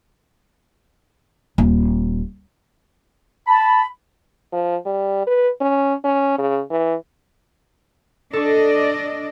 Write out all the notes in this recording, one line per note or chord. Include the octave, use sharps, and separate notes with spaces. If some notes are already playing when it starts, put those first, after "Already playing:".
D#1
A5 B5
F3
G3
B4
C#4
C#4
C#3
E3
D4 A4 D5 D#5 C#6